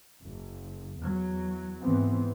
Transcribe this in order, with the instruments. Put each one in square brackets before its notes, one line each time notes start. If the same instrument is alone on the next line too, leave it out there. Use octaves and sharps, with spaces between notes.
[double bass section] F#1
E2 F#3
G#2 E3 B3 C4